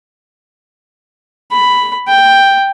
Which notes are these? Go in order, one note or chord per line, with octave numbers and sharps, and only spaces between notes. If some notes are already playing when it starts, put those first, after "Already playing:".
B5
G5